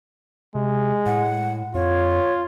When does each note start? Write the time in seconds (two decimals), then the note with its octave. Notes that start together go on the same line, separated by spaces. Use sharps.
0.55 C3 G#3
1.06 A2 F#5
1.74 F2 F4 C#5